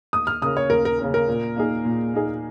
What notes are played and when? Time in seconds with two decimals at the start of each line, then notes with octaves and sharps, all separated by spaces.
0.13 D#2 D#6
0.27 F6
0.42 C#3 A#3 C#4 A#4 D#6
0.57 C#5
0.70 D#2 A#4
0.85 A#4
0.99 C#3 A#3 C#4 A#4
1.14 A#4
1.28 A#2
1.56 A#3 D#4 G#4
1.85 A#2
2.14 A#3 D#4 G#4